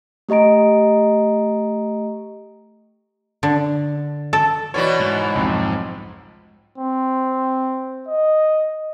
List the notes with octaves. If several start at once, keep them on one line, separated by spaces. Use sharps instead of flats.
A3 G4 D#5 A#5 D7
D3
A4
B2 E3 F#4 C#5 D5 B5
G#2
B1 F2
C4
D#5